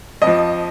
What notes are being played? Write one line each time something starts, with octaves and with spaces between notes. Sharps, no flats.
F2 D#5
F3